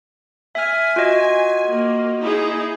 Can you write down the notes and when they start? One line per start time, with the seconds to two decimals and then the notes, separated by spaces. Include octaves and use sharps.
0.55 E5 G#5 F6
0.96 F4 F#4 D#5
1.67 A#3
2.21 D#4 E4 G#4